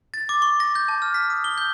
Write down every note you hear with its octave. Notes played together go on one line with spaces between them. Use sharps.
A6
D6
C#6
A#6
G6
A5
F6
B6
D#6
G7
G6